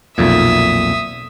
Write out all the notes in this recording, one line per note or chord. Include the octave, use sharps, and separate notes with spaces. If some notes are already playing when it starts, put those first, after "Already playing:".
B1 F2 A#2 E5 D#6